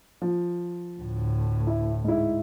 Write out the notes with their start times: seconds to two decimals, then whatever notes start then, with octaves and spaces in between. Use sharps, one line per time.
0.22 F3
1.00 D2 A2
1.67 E4
2.04 G#2 E4